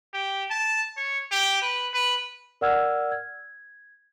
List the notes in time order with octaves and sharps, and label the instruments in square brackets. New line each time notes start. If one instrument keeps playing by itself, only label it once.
[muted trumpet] G4
A5
C#5
G4
B4
B4
[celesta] A#4 D5 F#5 E6 F6 G#6
G#6